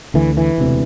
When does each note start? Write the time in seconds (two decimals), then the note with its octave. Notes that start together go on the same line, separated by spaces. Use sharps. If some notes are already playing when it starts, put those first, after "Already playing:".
0.14 D2 D3 E3
0.37 E3
0.58 E1 D2 C3